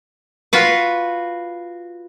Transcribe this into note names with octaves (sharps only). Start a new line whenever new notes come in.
F4 F#4 B4